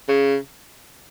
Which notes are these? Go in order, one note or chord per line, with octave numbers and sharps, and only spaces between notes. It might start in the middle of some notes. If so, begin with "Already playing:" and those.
C#3